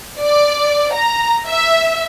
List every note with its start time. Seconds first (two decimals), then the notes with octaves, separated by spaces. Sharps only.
0.20 D5
0.94 A#5
1.47 E5